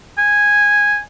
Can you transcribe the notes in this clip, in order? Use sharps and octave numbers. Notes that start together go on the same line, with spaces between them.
G#5